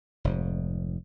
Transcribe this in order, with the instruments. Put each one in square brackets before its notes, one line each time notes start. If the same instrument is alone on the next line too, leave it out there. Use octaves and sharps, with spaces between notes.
[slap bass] F1 G#2